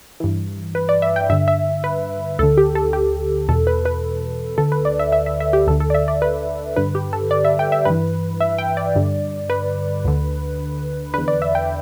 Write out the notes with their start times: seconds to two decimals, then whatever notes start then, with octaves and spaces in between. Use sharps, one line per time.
0.20 G2 E3
0.75 B4
0.89 D5
1.02 E5
1.16 G5
1.30 G2 D3 E5
1.48 E5
1.84 B4
2.39 D2 D3 A4
2.57 G4
2.75 A4
2.93 G4
3.48 E2 B2 A4
3.67 B4
3.85 B4
4.58 D2 D3 A4
4.72 B4
4.85 D5
4.99 E5
5.12 E5
5.26 E5
5.40 E5
5.53 G4
5.67 D2 D3 A4
5.80 A4
5.90 D5
5.94 E5
6.08 D5
6.22 B4
6.76 G2 D3 B4
6.95 G4
7.13 A4
7.31 D5
7.44 E5
7.59 G5
7.72 E5
7.85 G2 E3 B4
8.40 E5
8.58 G5
8.77 D5
8.95 G2 D3
9.50 B4
10.05 D2 D3
11.14 E2 D3 B4
11.28 D5
11.42 E5
11.55 G5